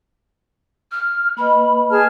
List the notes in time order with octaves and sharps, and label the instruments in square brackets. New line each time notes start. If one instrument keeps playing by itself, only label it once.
[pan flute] F6
[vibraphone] A#3 B4 D#5 [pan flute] B5
[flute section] G#4 A5 F6